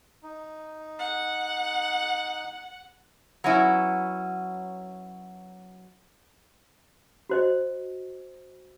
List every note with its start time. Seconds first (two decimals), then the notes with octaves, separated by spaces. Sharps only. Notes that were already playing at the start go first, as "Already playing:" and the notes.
0.23 D#4
0.99 F#5
3.44 F#3 B3 C#4 E4
7.30 F#4 C5 D#5